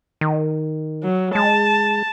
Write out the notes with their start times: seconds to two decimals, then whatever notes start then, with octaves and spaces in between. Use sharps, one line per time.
0.21 D#3
1.03 F#3
1.35 G#3 A5